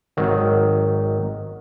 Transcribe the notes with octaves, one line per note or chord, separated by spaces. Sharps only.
G#1 D#3 F#3